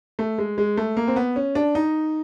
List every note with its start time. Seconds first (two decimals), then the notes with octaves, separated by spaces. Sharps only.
0.19 A3
0.38 G#3
0.58 G#3
0.77 A3
0.97 A#3
1.07 C4
1.16 B3
1.36 C#4
1.55 D4
1.75 D#4